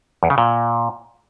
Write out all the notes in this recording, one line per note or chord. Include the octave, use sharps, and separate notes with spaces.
E2
C#3
A#2